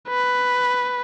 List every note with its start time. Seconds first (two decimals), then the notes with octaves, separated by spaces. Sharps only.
0.09 B4